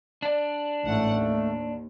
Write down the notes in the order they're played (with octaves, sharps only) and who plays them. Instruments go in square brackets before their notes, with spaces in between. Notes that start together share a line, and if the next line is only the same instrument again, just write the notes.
[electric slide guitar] D4 D5
[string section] A1 G#2 F#5 [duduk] A3
[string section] D#2